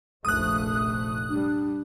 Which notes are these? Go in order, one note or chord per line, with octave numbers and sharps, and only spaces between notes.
F1 A#1 A3 D#6 F#6
G3 D4